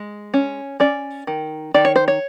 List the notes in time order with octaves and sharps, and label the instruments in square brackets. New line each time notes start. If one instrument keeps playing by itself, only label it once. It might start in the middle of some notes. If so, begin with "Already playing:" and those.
Already playing: [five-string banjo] G#3
C#4
C#4 D5
D#3
D#3 D5
C#5
C5
C#5